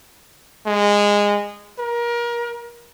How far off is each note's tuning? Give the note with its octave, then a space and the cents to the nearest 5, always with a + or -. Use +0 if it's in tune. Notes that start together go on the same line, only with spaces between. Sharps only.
G#3 -20
A#4 +30